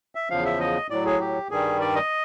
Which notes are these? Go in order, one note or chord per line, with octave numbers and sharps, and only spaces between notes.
E5
E2 C#3 F3 F5
E5
D#5
A2 F#3 D5
G#4
G4
G2 D#3 G3 G#4
D5
D#5